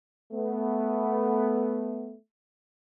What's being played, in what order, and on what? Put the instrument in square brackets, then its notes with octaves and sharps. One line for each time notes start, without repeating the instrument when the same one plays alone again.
[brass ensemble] A3 B3